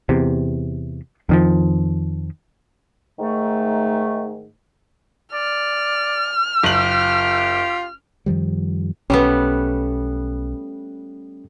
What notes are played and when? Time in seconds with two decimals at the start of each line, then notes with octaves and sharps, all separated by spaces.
0.09 E2 C3
1.29 F2 D#3 F3
3.19 G#2 D#3 A3
5.33 D5 F6
6.63 F#1 F4 G4 F#7
8.26 F#2 D#3 F3 G3
9.10 B1 G3 A3 B3 C#4